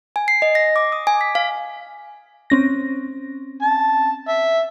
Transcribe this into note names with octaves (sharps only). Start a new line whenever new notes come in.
G#5
C7
D#5
A#6
D6
D#6
G#5
B6
F5
C4 C#4 A#6
A5
E5